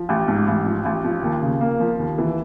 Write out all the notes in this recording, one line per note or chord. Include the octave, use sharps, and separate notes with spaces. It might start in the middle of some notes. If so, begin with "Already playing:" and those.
Already playing: F3
A1
G#2
A1
F3
A1
F3
D#2
C#3
A#3
F3
D#2
E3